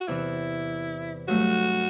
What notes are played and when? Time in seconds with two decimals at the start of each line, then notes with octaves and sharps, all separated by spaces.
0.01 F#4
0.07 E2 C3 E3 E4
1.28 G2 F#3 A3 F#4